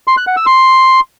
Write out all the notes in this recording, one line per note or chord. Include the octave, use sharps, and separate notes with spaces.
C6
F#6
F#5
E6
C6